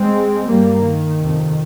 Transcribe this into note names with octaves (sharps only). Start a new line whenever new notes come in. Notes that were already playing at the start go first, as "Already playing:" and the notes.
Already playing: G#3 C4
G2 G3 A#3
D#3
F2 C3